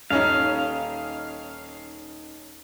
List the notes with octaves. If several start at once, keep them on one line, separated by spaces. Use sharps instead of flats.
D#1 C#4 D#4 F5